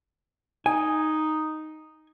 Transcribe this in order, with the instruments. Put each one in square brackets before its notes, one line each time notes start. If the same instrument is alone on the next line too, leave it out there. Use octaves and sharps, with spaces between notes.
[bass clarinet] D#4 [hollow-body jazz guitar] G#5